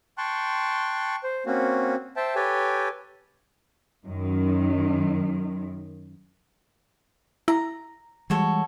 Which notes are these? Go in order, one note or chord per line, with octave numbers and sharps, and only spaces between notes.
G5 A5 C6 C#6 F#6
C5
A#3 C4 C#4 F#4
C5 E5 G5 A5
G4 A4 B4 C#5 G5 G#5
F#2 D#3
E4 A#5
E3 G3 G#3 F#4 A4 C#5